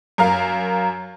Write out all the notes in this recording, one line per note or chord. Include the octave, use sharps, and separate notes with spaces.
F#2 A#4 F5